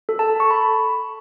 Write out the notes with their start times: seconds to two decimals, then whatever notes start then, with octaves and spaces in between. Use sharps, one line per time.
0.09 A4
0.19 A5
0.30 A4
0.40 C#6
0.50 B5